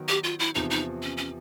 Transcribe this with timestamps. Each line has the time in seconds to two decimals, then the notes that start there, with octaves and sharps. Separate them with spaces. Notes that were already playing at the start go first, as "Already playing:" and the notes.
Already playing: D#3 F#3 B3
0.08 G4
0.24 F4
0.39 E4
0.55 E2 C3 F3 D#4
0.70 D#4
1.02 C#4
1.17 C#4